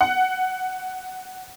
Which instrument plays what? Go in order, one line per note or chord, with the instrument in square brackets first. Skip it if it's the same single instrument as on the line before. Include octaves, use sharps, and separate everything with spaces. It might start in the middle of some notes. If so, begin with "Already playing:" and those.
[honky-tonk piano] F#5